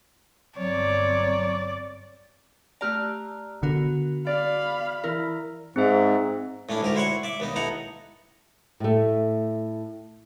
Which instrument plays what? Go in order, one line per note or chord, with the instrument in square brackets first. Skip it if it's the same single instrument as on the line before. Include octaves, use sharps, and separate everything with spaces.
[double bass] G1 C4 [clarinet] F#3 [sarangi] C#5 [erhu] D5
[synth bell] A3 G4 D5 [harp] A#5 F6 F#6
[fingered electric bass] D3 [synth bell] B3 F#4 A#4
[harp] D5 [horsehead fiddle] F5 B5
[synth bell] E3 E4 [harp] A#4
[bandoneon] G#2 [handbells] C4 G#4 E5
[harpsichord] A2 C#4 D4 E4
D2 G#2 G4 A#4
E4 C5 C#5 F#5 C#6
D5 E5 D6
D#2 B3 D#4
D#4 E4 A4 F#5 A#5
[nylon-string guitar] A2 A3